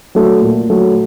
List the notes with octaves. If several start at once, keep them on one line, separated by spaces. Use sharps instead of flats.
F#3 A3
A#2
F#3 A3